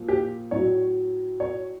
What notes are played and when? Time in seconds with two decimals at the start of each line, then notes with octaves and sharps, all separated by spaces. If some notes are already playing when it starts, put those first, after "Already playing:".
Already playing: A#2 F3
0.08 G4
0.51 A2 F#3 C#5
1.40 C#5